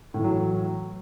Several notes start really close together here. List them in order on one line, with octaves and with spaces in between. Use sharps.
A2 E3 F#3